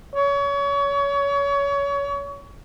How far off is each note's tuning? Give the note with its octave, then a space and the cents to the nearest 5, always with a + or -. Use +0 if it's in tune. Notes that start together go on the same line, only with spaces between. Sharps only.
C#5 +30